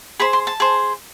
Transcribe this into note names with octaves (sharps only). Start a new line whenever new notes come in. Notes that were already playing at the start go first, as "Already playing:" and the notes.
G#4 C5 B5
C6
A5
G#4 C5